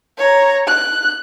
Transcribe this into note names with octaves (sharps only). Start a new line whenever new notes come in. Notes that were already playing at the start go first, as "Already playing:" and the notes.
C#5 A#5
F#6